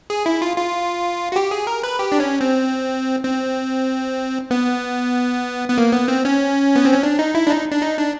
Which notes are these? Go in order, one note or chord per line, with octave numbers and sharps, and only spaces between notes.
G#4
E4
F4
F4
F#4
G4
G#4
A#4
B4
G4
D4
C#4
C4
C4
B3
B3
A#3
B3
C4
C#4
B3
C4
C#4
D4
D#4
E4
D4
D#4
D4
D#4
D4